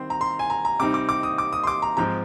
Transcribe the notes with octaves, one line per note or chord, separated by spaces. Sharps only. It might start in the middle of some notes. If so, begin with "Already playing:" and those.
Already playing: D#3 G3 C4 C6
A#5
C6
G#5
A#5
A#5
C3 G3 C4 D#4 D6
D6
D6
D#6
D6
D#6
C6
D6
A#5
G#2 F3 C4 A#5